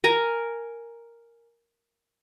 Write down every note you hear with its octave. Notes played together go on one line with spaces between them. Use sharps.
A#4 G#5 A#5